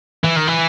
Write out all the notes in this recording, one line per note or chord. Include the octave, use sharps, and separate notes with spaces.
E3
D#3
E3